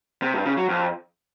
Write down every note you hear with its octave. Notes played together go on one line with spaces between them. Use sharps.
C3
G2
C#3
F#3
F2